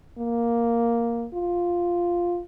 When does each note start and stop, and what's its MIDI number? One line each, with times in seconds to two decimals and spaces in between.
0.18 1.26 58
1.34 2.41 65